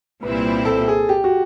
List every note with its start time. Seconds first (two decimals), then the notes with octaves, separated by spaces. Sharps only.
0.22 C2 A#2 G3 C4 E4 B4
0.65 A4
0.88 G#4
1.09 G4
1.24 F#4